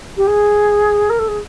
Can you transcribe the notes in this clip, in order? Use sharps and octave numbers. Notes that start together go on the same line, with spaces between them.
G4
G#4
A#4
A4
G#4